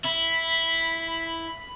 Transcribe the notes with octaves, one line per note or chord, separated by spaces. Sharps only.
E4 B5